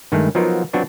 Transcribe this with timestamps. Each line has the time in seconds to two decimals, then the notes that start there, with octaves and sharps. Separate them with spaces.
0.12 G2 D#3 G#3 A3
0.35 F3 F#3 B3 D#4 F4 A#4
0.73 F#3 B3 C4 D4 F4 F#4